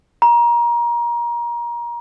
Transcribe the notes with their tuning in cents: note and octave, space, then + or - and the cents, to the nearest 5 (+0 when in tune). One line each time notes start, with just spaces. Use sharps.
A#5 +25